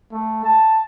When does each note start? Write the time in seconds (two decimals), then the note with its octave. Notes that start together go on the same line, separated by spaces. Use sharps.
0.12 A3
0.44 A5